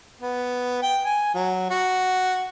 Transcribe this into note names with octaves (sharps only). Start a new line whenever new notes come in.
B3
G5
G#5
F#3
F#4